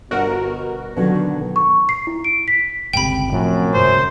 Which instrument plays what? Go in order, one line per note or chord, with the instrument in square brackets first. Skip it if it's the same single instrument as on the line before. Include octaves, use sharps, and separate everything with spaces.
[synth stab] G1 F#4 A#4 [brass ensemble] B2
[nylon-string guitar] B2 D#3 F#3 [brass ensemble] D3
[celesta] C#6
C7
E4
D7
B6
[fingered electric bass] G1 C#2 C3 [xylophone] G5 B5
[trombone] F#2 [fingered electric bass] A2 C3 F3
[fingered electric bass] D#1 G#2 C#3 [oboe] C5